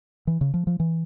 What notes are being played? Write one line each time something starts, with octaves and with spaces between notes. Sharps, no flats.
E3
C#3
F3
F3
E3